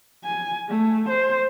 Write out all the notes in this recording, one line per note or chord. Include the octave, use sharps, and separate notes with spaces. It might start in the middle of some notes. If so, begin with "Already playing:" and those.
G#5
A3
C5